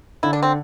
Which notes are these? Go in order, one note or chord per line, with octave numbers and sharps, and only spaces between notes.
D3 E4
D4
C4